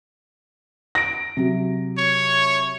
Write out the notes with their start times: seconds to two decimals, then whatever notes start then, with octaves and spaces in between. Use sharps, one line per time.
0.95 A#6 D7
1.37 C3 F#3
1.98 C#5